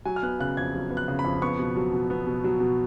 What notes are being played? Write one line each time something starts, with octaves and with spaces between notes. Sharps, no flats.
F#3 G#5
F6
B3 F#6
C#3 F#6
F2 G#6
F#3
B3
F#6
C#3
B5
F2
B3 C#6
B2
F#3
B2
B3
B2
F#3
B2